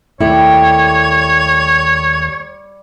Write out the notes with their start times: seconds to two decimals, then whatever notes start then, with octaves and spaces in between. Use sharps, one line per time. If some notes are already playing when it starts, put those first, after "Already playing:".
0.21 D#2 G3 A3 E4 C#5